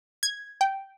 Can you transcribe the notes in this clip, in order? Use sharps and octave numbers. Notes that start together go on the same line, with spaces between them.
G#6
G5